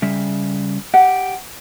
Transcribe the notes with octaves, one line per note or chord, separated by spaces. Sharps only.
C#3 G3 E5
G4 F#5